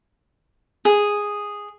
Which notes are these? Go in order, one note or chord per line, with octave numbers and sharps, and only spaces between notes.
G#4